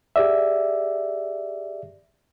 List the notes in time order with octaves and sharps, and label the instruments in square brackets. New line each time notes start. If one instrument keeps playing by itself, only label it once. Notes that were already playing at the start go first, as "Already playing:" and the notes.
[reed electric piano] G4 G#4 D5 E5